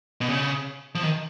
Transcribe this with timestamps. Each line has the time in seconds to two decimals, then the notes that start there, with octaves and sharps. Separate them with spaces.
0.21 B2
0.28 C#3
0.95 F3
1.03 D#3